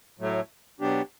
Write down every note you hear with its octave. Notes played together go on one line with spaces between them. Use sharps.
A2 F#3 A3
B2 F#3 B3 D4 G4